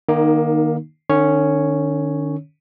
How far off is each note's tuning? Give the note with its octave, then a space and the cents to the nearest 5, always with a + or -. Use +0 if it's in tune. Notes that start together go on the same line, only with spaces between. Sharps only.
D#3 -20 A#3 +20 D#4 +0
D#3 -45 C#4 +0 C#5 +0